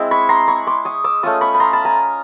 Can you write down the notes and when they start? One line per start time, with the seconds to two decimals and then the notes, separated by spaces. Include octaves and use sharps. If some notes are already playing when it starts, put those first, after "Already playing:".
Already playing: G#3 C4 E4
0.11 B5 C#6
0.29 A#5 C6
0.48 B5 C#6
0.67 C6 D6
0.85 C#6 D#6
1.04 D6 E6
1.23 A3 C#4 F4 C#6 D#6
1.41 B5 C#6
1.54 B5
1.60 A#5 C6
1.73 A5 B5
1.85 G#5 A#5